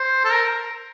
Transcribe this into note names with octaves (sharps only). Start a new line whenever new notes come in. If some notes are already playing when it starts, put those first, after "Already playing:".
Already playing: C5
A4
A#4